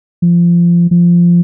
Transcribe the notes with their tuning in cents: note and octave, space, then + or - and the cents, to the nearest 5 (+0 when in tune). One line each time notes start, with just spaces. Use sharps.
F3 -20
F3 -10